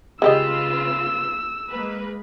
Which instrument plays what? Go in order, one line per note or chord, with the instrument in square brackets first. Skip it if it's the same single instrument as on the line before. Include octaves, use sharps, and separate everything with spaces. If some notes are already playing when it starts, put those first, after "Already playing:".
[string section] C#3 F4 B4 [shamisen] G#3 G4 D#5 [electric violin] E6
[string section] G#3 A#3 B4